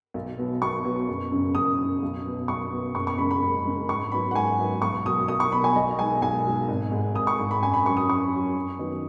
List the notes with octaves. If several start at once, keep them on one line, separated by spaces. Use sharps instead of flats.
B1
B2 F#3 B3
B1 C#6
B2 F#3 B3
F#1
F#2 C#3
F#1 D#6
F#2 C#3
B1
B2 B3
B1 C#6
B2 B3
F#1 C#6
C#6
F#2 C#3 G#3 B5
B5
F#1
F#2 C#3 G#3
G#2 C#6
F#3 B3 D#4 B5
F#5
G#2 G#5
F#3 B3 D#4
B1 C#6
B2 F#3 D#6
B1 D#6
C#6
B2 F#3 B5
G#5
B1 D#5
B2 G#3 D#4 G#5
B1 G#5
B2 G#3 D#4
G#1
G#2 G#3
G#1 D#6
C#6
G#2 G#3
B5
F#2 G#5
B5
F#3 C#4 C#6
D#6
F#2 C#6
F#3 C#4
F#2
D#3 F#3 B3 D#4